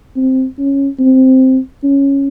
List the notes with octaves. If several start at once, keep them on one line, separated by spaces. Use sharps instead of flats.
C4
C#4
C4
C#4